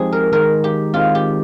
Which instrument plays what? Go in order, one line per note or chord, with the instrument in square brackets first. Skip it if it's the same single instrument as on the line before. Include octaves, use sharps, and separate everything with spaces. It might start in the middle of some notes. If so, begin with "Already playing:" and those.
Already playing: [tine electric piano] F3 G#3 C4 D#4 G4 [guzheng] G#4 C5
[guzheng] A#4
[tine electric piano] D#3 G#3 D#4 [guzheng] A#4
[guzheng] G4
[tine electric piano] D#3 G#3 C4 [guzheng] F4
[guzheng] G4